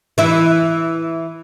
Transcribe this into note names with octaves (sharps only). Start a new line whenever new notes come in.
E3 E4